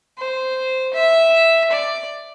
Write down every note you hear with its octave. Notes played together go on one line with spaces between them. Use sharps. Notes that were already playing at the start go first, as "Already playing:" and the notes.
C5
E5
D5